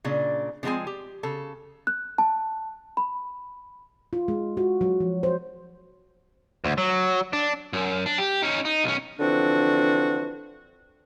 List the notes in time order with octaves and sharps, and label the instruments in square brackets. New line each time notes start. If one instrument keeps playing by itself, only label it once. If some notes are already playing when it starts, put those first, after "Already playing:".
[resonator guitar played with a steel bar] A#2 C#3 D4
C#3 F3 G#3 C4 G#5
G4
C#3 A4
[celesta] F#6
A5
B5
[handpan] F4
G#3
F#4
F#3
F3
C5
[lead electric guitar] D2
F#3
D4
[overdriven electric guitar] F#2
D4
G4
C#4 D#4
D#4
B1 C#4
[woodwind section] D3 E3 F3 C4 D4 F#4